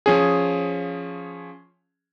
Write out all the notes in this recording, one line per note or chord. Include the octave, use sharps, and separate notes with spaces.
F3 C#4 G#4